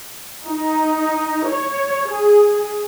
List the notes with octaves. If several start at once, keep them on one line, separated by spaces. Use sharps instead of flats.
D#4
C#5
G#4